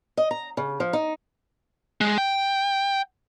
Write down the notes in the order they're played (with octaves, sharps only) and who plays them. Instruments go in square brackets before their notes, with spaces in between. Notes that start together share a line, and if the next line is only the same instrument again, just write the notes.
[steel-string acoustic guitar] D#5
A#5
C#3
F3
D#4
[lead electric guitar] G#3
G5